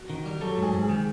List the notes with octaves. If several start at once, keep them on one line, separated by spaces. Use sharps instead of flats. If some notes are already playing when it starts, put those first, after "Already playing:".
Already playing: F#4
D#3
G3
F#3 A4
G#2 G#4
G#2
G#4
D#3